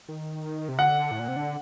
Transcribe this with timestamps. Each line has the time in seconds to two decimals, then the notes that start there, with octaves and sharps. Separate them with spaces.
0.09 D#3
0.69 C3
0.79 D3 F#5
1.11 A2
1.19 A#2
1.28 C3
1.36 D3